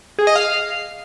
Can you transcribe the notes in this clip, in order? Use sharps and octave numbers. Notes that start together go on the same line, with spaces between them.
G#4
D#5
F5